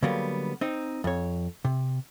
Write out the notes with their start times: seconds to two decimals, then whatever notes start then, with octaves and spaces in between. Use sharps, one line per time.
0.03 D3 F#3 G3 A#3 B3
0.61 C4 D#4
1.04 F2 C#5
1.65 C3